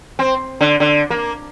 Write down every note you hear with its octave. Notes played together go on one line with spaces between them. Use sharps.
C4
D3
D3
A#3